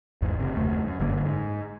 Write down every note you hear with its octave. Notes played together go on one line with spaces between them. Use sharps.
G#1 E2 G#2 G#3
F#1 C3
F#1 D#2 A3
F#2
F#1 G2 D3 A#3
G#2